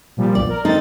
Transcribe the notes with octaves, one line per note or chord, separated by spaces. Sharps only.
A#2 F3 G3
B1 F2 D5
A#4
D#3 C4 D#4 A4 A6